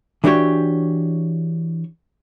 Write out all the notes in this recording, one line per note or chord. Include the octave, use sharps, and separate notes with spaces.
E3 D4 F#4 G4 C#5